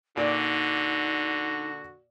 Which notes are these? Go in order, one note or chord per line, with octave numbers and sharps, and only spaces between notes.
A#2 D3 D#4 F#4 D5